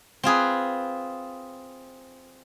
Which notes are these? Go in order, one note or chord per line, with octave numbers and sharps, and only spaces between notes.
C4 F4 G#4 B4